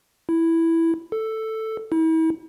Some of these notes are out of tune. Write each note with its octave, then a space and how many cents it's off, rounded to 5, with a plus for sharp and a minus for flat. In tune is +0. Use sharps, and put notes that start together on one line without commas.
E4 +0
A4 +5
E4 -40